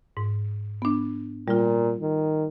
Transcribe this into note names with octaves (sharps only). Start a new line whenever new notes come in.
G#2
B3 D4
A#2 G3 F4
D#3